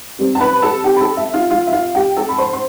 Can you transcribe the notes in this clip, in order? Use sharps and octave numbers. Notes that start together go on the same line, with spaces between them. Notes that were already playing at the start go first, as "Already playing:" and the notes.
C3 G3 C4
A5
B4 B5
A4 A5
G4 G5
B5
A4 A5
E5
F4 F5
F4 F5
E5
F4 F5
G4 G5
A4 A5
B5
C5 C6
C6